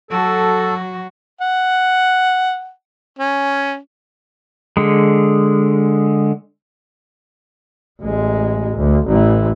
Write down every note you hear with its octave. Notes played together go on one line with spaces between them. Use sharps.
F#3 F#4 A4
F#5
C#4
D3 G#3
A1 G#3
D2
A1 E3